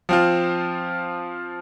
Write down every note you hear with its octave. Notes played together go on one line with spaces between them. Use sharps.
F3 C4 F4